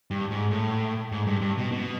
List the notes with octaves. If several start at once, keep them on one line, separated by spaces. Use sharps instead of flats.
G2
G#2
A2
G#2
G2
G2
B2
B2